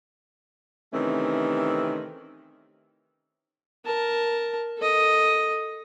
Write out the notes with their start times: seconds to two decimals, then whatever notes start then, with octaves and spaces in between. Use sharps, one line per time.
0.93 C3 D#3 E3 A3 C4 C#4
3.85 A#4 A5
4.77 A4 D#5